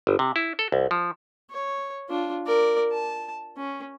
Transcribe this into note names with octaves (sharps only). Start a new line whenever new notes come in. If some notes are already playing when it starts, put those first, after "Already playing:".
G1
C3
E4
A4
C2
F3
C#5
D4 F4
A#4 D5
A5
C#4